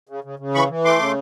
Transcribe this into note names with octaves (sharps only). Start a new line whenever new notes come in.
C#3
C#3
C#3
E3 B5 C#6
E3
A3 C6 D6
C#3